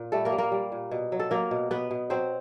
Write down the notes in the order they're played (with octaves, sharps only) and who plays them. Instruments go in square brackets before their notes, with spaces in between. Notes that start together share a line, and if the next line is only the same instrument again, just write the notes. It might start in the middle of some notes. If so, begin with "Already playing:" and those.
Already playing: [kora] A#2
G3 A3 A4
A#3 A#4
G3
A#3 A#4
G3
A#2
B2
F#3
A4
F#3 A#3 A#4
B2
B2 B3 B4
B2
F#3 C4 C5